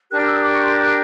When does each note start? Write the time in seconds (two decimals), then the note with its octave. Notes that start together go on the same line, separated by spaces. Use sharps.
0.09 D4 G4 A#4 F#6
0.18 F6
0.26 E6
0.34 D#6
0.41 D6
0.53 C#6
0.63 C6
0.74 D6
0.82 F#6